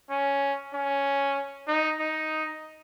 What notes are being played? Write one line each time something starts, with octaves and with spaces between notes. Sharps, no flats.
C#4
C#4
D#4
D#4